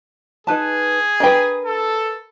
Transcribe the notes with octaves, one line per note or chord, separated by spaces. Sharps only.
D#4 G#4 B4 A5
D4 A#4 B4 D#5 G5
A4